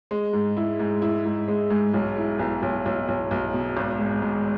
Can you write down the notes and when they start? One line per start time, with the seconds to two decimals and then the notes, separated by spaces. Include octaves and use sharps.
0.11 G#3
0.33 G#2
0.57 E4
0.79 G#2
1.02 E4
1.25 G#2
1.48 G#3
1.70 G#2
1.94 B1
2.17 E4
2.39 B1
2.62 B1
2.85 B1
3.08 B1
3.31 B1
3.54 B2
3.77 G#1
3.99 G#2
4.22 G#2